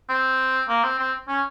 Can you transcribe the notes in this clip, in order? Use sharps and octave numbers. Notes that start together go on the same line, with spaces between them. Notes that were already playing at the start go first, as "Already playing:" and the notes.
C4
A#3
C4
C4
C#4